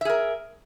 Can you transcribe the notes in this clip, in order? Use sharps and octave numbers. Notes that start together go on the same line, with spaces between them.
G#4 A#4 E5